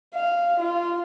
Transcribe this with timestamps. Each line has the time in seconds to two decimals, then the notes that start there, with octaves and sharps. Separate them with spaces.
0.15 F5
0.60 F4